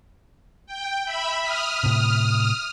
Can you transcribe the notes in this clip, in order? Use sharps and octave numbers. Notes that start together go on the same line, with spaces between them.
G5
E5 B5
D#6 F6
A2 C3